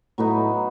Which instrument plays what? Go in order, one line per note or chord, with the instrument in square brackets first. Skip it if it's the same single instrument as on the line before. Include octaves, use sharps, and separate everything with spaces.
[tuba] A2 [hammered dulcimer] F#3 B3 D#4